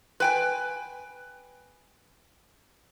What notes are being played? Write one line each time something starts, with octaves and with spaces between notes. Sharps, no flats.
B4 G5 G#5